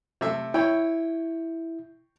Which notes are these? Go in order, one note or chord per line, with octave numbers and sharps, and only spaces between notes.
C3 A3 E5
E4 C#5 G5